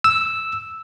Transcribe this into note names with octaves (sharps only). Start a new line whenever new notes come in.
E6